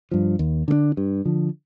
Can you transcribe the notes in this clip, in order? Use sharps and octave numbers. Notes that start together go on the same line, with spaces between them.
G2 F3
D#2
D3 A3 D4
G2
D3 F3